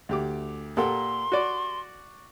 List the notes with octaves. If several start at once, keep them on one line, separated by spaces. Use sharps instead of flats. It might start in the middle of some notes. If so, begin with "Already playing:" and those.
D2 G4 D6
A#2 G4 A4 A#4 F#5 C6
F#4 D5